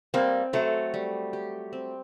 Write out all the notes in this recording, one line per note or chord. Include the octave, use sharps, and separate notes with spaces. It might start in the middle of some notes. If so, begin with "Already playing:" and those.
G3 A#3 C4
F#3 A3 C5
G3
G4
C4